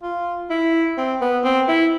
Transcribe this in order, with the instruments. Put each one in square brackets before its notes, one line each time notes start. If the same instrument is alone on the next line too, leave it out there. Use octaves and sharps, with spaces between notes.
[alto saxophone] F4
E4
C4
B3
C4
E4